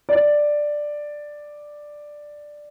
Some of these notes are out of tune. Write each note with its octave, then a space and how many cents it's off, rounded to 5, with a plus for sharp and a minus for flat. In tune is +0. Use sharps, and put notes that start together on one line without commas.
D5 +5